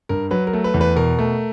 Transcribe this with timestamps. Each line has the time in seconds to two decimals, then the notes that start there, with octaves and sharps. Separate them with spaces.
0.09 G2 A#4
0.31 F#3 B4
0.47 A#4
0.53 A3
0.64 B4
0.74 E2
0.81 B4
0.96 B2 A#4
1.19 A3